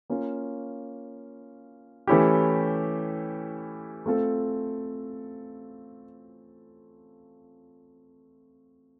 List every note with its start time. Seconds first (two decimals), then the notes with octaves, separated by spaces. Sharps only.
0.10 A#3 C#4 F4
2.07 E3 A3 C#4 E4 G4
4.06 A3 C4 F4 A4